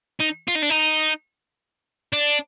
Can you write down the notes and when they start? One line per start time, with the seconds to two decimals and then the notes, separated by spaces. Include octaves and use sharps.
0.20 D#4
0.48 F4
0.56 D#4
0.63 D4
0.70 D#4
2.13 D4